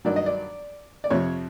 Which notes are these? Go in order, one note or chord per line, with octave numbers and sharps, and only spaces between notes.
G2 D#3 F#3 D5
D#5
D5
D5
F2 C3 F3 C#5